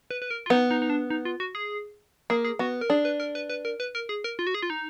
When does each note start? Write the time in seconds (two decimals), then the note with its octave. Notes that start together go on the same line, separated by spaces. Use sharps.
0.11 B4
0.22 B4
0.31 A#4
0.46 F4
0.50 B3 D#4
0.71 D#4
0.82 D#4
0.90 D4
1.10 D#4
1.25 F4
1.40 F#4
1.55 G#4
2.30 A#3 G#4
2.45 G#4
2.59 B3 F#4
2.81 A#4
2.90 D4 G#4
3.05 B4
3.20 A#4
3.35 B4
3.50 B4
3.65 A#4
3.80 B4
3.95 A#4
4.09 G#4
4.24 A#4
4.39 F4
4.47 F#4
4.54 G#4
4.62 F4
4.70 D#4